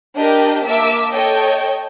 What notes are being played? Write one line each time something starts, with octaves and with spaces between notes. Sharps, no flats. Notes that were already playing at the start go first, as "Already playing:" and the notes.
D4 G4 A#4 D#5 G5
A#3 E5 A5 D6 E6
A4 C#5 D#5 G5